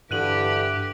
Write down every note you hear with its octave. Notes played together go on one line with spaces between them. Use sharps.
G2 D3 E3 G4 F#6 D#7 F#7